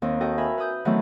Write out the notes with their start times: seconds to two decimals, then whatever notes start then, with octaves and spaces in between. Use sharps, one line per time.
0.02 D#2 D#3 C4
0.21 F#4 A4 D#5 G5
0.38 A#4 E5 G#5 B5
0.58 B4 B5 D#6 G6
0.85 D#3 E3 F#3 A3 B3 C4